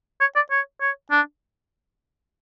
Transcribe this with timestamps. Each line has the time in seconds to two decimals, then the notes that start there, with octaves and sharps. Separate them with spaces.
0.21 C#5
0.35 D5
0.51 C#5
0.81 C#5
1.11 D4